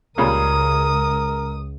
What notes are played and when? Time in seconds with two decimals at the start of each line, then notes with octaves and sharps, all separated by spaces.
0.18 C#2 A#2 C#3 G3 A#4 D#6